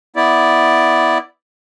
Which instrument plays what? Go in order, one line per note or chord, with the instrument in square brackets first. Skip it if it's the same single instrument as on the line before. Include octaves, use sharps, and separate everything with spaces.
[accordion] B3 E4 D5